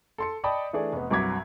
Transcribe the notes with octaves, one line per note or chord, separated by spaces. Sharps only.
A4 C6 C#7
D5 D#5 G5 A5 B5 D#6
E3 A3 D4 G#4 D5
F1 B3
C2 G2 F#3 D6 G#6 B6